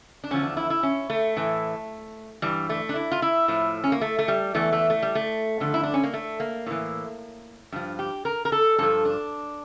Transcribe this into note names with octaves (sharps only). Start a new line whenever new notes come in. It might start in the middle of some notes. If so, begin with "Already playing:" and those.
D4
E2 D3 F3 C#4
D4
E4
E4
C#4
A3
A2 E3
G2 E3 G3
A3
D4
E4
F4
E4
A2 F3
C#4
A#3
A3
A3
G3
E2 E3 A3
A3
A3
G3
A3
G2 D3 F3
E4
D4
C#4
A#3
A3
A#3
A2 E3
G2 F3
G4
A#4
A#4
A4
G2 F3 A4
D4